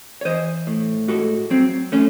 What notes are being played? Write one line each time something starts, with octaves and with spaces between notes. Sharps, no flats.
C#5
E3 C5 D#5
A2
G#3 F#4 A4
F#3 C4
A3 C#4